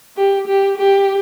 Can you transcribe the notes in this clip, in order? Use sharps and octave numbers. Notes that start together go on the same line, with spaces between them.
G4
G4
G4